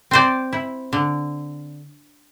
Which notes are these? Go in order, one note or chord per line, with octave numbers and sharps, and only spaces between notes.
C4 C5 D5
E4
D3